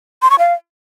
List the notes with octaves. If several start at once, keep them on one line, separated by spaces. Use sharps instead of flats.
C6
C#6
F5